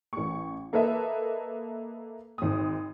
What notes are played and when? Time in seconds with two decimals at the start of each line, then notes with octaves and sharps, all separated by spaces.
0.13 A1 C#6
0.73 A#3 A4 B4 D#5 E5
2.38 G#1 D#6